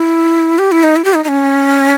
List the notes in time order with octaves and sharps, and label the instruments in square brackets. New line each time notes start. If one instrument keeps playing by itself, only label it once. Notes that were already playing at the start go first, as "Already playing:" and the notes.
Already playing: [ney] E4
G4
E4
D#4
E4
G4
D#4
D#4
C#4